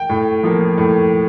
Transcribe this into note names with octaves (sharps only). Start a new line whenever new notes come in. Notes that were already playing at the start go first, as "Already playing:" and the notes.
Already playing: G5
A2
F3 A#3
A2